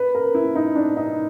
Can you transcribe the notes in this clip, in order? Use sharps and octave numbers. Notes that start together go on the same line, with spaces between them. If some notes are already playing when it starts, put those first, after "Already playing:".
Already playing: B4
A#4
E4
D#4
D4
D#4